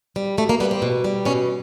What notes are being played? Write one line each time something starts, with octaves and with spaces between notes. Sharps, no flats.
G3
B2 A3
A#3
G3 B3
C4
B2
G3
B2 C#4